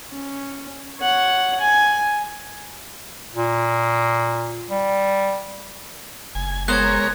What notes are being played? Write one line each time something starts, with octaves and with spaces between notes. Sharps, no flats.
C#4
C#5 F#5
G#5
A#2
G3
F#1 G#5
G#3 B3 A#4 C5 C#5 A#5 F#6 G#6